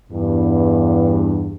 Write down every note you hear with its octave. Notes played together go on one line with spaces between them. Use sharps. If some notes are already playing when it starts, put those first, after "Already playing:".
E2 G2